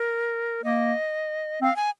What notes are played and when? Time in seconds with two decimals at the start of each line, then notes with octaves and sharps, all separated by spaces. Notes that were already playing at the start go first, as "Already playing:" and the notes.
Already playing: A#4
0.63 A#3 D#5
1.61 C4 F5
1.76 G#5